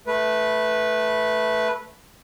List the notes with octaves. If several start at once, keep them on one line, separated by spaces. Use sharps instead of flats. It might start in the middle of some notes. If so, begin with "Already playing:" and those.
A3 B4